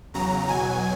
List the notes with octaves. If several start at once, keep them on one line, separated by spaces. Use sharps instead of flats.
E2 C#3 F#3 A#5
E2 B2 F#3 G#5